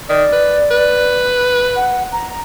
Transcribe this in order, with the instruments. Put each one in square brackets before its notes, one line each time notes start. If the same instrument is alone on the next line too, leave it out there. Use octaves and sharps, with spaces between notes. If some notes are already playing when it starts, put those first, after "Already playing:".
[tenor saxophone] D#3 [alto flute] D5
[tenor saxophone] B4
B4
[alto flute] F#5
A#5